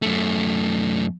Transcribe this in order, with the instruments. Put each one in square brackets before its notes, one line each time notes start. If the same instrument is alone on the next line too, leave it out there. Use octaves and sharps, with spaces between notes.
[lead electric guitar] F#2 A3